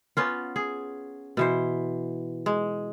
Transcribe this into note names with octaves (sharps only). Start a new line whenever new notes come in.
B3 C#4 F4
G#4
B2 E3 C5
G#3